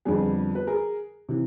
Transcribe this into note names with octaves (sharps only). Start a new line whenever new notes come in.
F2 D3 G3 B3 G#4
B4
G#4 A#4
C3 E3